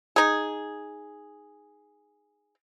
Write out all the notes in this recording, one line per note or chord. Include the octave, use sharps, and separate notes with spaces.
D#4 G#4